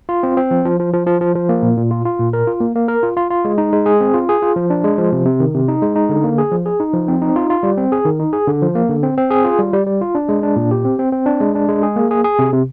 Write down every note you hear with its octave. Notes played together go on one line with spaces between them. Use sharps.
F4
C4
C4
F3
F3
F3
F3
F3
F3
F3
A#3
A#2
A#2
F4
F4
A#2
A#4
F4
A#3
A#3
A#4
F4
F4
F4
G#3
D#4
G#3
G#4
C4
F4
G#4
F4
F3
D4
G#3
F3
C3
C3
D#3
C3
D#4
G#3
D#4
D3
A#3
G#4
F3
G#4
D#4
F3
C4
D#4
F4
F4
G3
C4
G#4
D#3
D#4
G#4
D3
F3
A#3
D3
C4
C4
G#4
F4
G3
G3
G3
F4
D4
G#3
D4
A#2
G4
C4
C4
C4
D4
G#3
D4
G#3
G#4
A#3
G#4
G#4
C3
C3